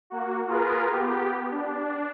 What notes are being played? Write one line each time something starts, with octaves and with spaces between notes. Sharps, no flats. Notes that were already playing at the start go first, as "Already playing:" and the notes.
A#3 F#4
F4 G#4 A#4 B4
B3 G4
D4